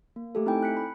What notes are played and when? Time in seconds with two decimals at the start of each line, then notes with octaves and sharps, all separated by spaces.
0.16 A#3
0.35 A3 G4 A4
0.46 C4 D#4 E4 A4 G5 G#5
0.63 F#6 B6 C#7
0.77 B5